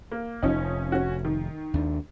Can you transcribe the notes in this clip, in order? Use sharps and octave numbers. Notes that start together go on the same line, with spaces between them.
A#3
F1 F3 C#4 D#4
C#4 F#4
D#3
D#2 D4